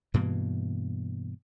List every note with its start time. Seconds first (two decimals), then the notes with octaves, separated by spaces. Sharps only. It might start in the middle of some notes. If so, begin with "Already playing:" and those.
0.14 G2 B2 E3 A#3